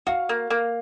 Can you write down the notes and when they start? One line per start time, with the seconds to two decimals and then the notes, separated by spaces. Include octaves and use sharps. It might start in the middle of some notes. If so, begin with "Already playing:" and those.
0.07 F#4 F5
0.29 A#3
0.50 A#3